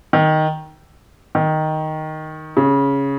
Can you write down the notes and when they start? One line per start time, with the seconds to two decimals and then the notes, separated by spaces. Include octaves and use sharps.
0.13 D#3
1.35 D#3
2.57 C#3